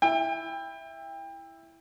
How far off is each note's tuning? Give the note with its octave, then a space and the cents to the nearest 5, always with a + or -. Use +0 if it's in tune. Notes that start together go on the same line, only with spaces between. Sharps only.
E4 +0 G5 +25